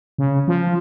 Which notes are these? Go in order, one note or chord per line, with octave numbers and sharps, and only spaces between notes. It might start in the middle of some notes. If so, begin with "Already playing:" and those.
C#3
F3